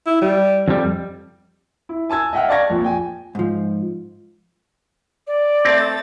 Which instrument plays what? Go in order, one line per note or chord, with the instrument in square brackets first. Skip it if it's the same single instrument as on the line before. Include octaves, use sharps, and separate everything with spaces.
[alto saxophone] E4
G3
[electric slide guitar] F2 G3
[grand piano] E4
G#5 A5 E6 G#6
D#5 E5 F#5 G5 F6
D5 F5 A5 C#6 G#6 A#6
A#1 F2 A#2
G5 G#5
[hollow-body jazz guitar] G#2 F3
[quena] D5
[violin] A3 A6 [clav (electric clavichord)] C4